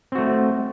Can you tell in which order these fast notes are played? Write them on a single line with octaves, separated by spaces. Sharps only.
C4 F#4 A3